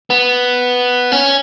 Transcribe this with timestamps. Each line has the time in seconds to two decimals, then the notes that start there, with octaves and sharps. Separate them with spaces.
0.10 B3
1.12 C#4